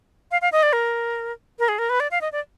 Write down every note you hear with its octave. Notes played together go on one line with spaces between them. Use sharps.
F5
F5
D#5
D5
A#4
A#4
G#4
A#4
B4
D5
F5
D#5
D5